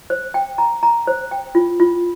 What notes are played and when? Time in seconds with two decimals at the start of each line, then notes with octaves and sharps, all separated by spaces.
0.10 C5
0.34 G5
0.58 A#5
0.83 A#5
1.07 C5
1.31 G5
1.55 F4
1.80 F4